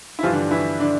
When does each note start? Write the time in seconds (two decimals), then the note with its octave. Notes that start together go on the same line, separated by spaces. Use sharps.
0.19 E4
0.23 G2 E3 F3 G3 F4
0.33 D3 D4
0.51 E3 E4
0.80 D3 D4